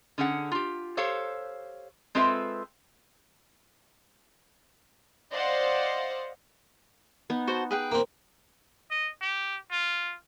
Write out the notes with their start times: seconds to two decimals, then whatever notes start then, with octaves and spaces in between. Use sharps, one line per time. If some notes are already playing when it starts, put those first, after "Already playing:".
0.18 D3 C#4 G#4 F#5
0.52 F4 G4
0.97 G4 A4 C5 C#5 F5
2.15 G#3 C4 F4 A4 B4 E5
5.33 C5 D5 D#5 F5 F#5
7.30 B3 D#4
7.47 F#4 C5 A5
7.71 G#4 B4 G5
7.92 A#3 C4
8.91 D#5
9.22 G4
9.71 F4